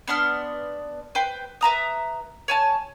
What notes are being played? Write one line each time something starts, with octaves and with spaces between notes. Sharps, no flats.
B3 D4 C6 F6
B4 C5 G5
B4 E5 A#5 D#6
C#5 G#5 A5